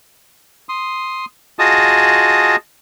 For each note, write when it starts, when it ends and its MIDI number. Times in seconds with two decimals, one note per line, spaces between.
0.69 1.25 84
0.69 1.25 87
1.59 2.56 65
1.59 2.56 66
1.59 2.56 68
1.59 2.56 75
1.59 2.56 81
1.59 2.56 87